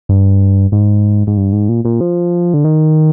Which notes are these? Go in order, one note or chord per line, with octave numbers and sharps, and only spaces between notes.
G2
G#2
G#2
G2
G#2
A#2
A#2
F3
D3
D#3